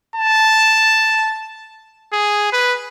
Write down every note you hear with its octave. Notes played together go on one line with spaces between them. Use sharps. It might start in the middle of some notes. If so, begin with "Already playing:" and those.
A5
G#4
B4